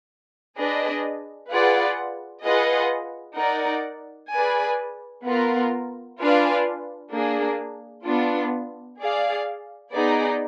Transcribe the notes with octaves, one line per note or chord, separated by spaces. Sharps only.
D4 G#4 B4 D#5
F4 G#4 B4 D5 F#5
F4 G#4 B4 D#5 F#5
D#4 A#4 D5 F#5
G#4 B4 D5 G#5
B3 F4 A#4
D4 F4 B4 F5 G#5
A#3 D4 G#4
B3 D4 F4
G#4 D5 F5
B3 D#4 G#4 D5